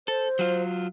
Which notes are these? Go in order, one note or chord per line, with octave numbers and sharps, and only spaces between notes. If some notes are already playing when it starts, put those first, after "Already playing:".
A4 C5
F#3 F4